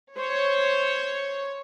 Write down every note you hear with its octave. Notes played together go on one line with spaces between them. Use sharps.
C5 C#5